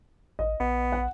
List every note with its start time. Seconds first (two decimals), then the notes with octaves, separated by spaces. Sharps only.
0.39 A1 D#5
0.60 A#1 B3
0.92 F#5